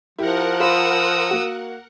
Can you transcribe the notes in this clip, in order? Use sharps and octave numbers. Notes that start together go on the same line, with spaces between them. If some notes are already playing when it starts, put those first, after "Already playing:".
F3 E4 G4 A#4 F#5
F4 C5 B5 D#6 E6
A#3 F#4